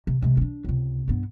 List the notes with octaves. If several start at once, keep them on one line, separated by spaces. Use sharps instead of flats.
C3
C3 G#3
C4 D4
C#2 C3
G2 B3